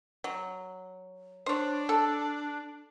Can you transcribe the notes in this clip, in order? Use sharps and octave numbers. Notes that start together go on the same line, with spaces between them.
F#3
D4 C5 C#5
A4